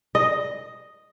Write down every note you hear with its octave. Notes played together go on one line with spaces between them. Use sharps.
D#5